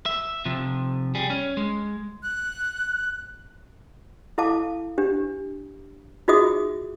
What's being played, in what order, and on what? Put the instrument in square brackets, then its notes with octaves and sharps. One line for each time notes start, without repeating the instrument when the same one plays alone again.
[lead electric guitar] E5
C3 F3
G3 G#4
C#4
G#3
[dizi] F#6
[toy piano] E4 A4 F5 A5 D6
D4 G4
D#4 F4 F#4 G#4 E5 D#6